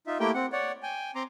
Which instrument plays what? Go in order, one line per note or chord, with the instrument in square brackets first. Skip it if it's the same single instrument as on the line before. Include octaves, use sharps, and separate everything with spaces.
[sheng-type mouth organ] D#4 F4 E5
A3 A#3 E4 G4 A#4 G5
C4 F#5
C#5 D5 F#5
G5 G#5
C4 A#5 C6 D6